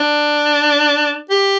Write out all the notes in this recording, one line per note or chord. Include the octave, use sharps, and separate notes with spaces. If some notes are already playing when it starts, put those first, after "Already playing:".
Already playing: D4
G4